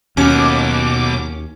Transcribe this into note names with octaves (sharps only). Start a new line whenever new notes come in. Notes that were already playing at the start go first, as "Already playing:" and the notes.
D#2 B2 F#3 C#4 D6